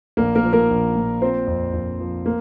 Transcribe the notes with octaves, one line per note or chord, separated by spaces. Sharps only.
A#1 A#3 A#4
A#3 A#4
F3
A#3 A#4
A#1
A#2
F3 C4 C5
F2
F2
F3
A#3